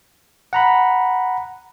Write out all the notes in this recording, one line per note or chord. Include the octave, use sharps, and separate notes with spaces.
F#5 A#5 B5